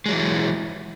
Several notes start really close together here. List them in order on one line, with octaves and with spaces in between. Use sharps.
G#3 F#3 E3